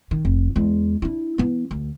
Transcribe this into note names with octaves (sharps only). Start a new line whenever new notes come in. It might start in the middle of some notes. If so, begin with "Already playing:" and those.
D#3
F1
E2 G#3
D4 E4
E3 B3
D2